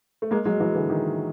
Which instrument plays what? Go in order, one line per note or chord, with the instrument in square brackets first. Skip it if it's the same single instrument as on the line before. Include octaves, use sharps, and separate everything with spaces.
[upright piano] A3
G#3 A#3
F#3 G#3
E3 F#3
D3 E3
D#3